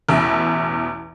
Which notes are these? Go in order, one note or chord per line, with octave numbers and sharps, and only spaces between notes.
A1 E2 B2 E5